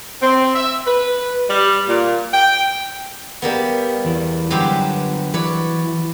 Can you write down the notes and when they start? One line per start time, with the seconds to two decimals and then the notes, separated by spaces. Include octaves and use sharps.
0.22 C4
0.55 E5
0.87 B4
1.49 G3
1.88 A#2
2.33 G5
3.42 G3 A#3 B3
4.05 E2 E3
4.51 D3 F#3 G3 G4 B4 C5
5.34 E3 B4 C#5 D5